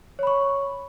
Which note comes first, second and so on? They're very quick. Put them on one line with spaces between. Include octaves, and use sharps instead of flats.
C#5 B5 C#6